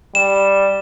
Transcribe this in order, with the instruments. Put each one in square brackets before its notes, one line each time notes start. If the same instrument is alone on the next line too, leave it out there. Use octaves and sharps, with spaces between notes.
[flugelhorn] G3 [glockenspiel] E7